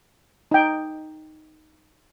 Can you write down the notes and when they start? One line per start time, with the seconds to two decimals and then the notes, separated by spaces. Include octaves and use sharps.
0.51 D#4 G5